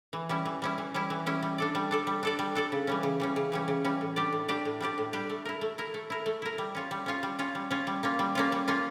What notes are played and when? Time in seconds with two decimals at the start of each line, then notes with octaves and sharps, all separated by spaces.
0.13 E3
0.29 G3 C#4 E4
0.45 E3
0.62 G3 C#4 E4
0.78 E3
0.94 G3 C#4 E4
1.10 E3
1.26 G3 C#4 E4
1.42 G3
1.58 D4 A4 D5
1.75 G3
1.91 D4 A4 D5
2.07 G3
2.23 D4 A4 D5
2.39 G3
2.55 D4 A4 D5
2.72 C#3
2.87 E3 G3 C#4
3.03 C#3
3.20 E3 G3 C#4
3.36 C#3
3.52 E3 G3 C#4
3.68 C#3
3.84 E3 G3 C#4
4.01 A2
4.16 G3 D4 G4 D5
4.32 A2
4.48 G3 D4 G4 D5
4.65 A2
4.80 G3 D4 G4 D5
4.98 A2
5.13 G3 D4 G4 D5
5.29 A3
5.45 E4 A#4
5.61 A3
5.78 E4 A#4
5.94 A3
6.10 E4 A#4
6.26 A3
6.42 E4 A#4
6.58 G3
6.75 C#4 F4 C#5
6.91 G3
7.06 C#4 F4 C#5
7.23 G3
7.39 C#4 F4 C#5
7.55 G3
7.71 C#4 F4 C#5
7.87 G3
8.03 A#3 C#4 F4
8.19 G3
8.35 A#3 C#4 F4
8.52 G3
8.68 A#3 C#4 F4